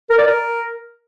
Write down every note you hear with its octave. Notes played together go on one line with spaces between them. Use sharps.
A#4
D5
A#4